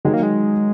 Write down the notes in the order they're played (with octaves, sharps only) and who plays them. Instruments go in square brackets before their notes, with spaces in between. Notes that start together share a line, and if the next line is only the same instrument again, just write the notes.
[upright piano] D#3 F#3 [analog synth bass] G#3
[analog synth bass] A#3
G#3